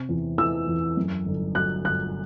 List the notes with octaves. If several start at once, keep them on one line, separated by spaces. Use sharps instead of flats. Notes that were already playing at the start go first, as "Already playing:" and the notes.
Already playing: C3
E2
E3 E6
E2
F#2
G1
F#3 F#6
G1 F#6